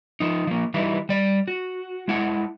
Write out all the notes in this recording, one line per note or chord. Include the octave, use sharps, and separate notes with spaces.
F3 D#4
F3 A#3
E3 G3 D#4 E4
G3 D5
F#4
G#3 E4 F#5 A5